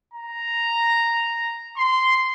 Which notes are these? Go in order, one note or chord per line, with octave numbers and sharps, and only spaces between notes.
A#5
C6